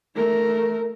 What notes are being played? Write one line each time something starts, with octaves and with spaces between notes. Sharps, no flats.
A3 A#4